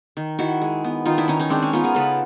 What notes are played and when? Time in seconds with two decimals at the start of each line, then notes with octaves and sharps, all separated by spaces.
0.17 D#3
0.39 D#3 E4 F#4
0.62 G#3
0.84 B3
1.05 D#3 D#4 F4
1.18 D4 E4
1.28 D#3 C#4 D#4
1.40 C#4 D#4
1.50 G#3 C4 D4
1.62 C#4
1.73 B3 D#4 F4
1.84 G#4 A#4
1.95 C#3 A4 B4